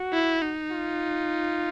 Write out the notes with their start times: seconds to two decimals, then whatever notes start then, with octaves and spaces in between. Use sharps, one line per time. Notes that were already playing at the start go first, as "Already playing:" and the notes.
Already playing: F#4
0.13 E4
0.42 D#4
0.71 F4